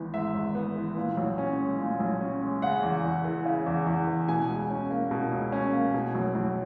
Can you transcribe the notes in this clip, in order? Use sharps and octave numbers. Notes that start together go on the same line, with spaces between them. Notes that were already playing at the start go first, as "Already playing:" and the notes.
Already playing: G#1 E3 B3
G#2 E5
G#1
B3
E3
A#2
B1
C#4
G#3
A#2
B1
C#4
G#3
C#3 F#5
E2
E2
E3
C#3
E2
E2
E3
B2 G#5
C#2
C#4
A#3
B2
C#2
C#4
A#3
B2
B1
B1